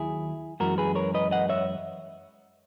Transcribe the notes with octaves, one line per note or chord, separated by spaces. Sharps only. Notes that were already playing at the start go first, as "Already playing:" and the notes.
Already playing: D#2 D#3 F#3 E4 G#4
F#2 E3 G#3 F#4 A#4
G#4 B4
A#4 C#5
B4 D#5
D#5 F#5
C#5 E5